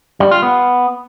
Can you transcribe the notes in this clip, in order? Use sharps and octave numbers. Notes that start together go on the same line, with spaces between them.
G3
F4
B3